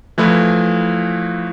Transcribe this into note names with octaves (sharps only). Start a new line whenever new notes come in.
E3 F3 A3 E4 B4